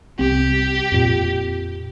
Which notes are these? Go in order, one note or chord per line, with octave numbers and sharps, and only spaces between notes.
C2 C4 G4
F2 A#2